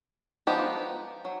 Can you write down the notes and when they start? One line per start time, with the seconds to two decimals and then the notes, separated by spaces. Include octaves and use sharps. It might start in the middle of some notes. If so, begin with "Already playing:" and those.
0.47 F3 G#3 B3 D#4 G4
1.25 F#3